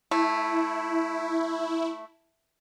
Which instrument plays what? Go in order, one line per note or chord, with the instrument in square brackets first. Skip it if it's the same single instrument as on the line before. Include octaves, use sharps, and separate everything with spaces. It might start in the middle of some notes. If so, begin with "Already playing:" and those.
[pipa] A3 [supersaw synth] E4